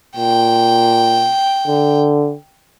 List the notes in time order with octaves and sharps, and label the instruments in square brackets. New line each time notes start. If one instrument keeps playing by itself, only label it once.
[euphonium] A#2 [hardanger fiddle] G5
[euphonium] D3